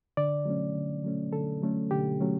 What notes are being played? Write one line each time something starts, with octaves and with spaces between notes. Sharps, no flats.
D3 D5
F#3 A3 C#4
D3
F#3 A3 C#4
D3 A4
F#3 A3 C#4
D3 G4
F#3 A3 C#4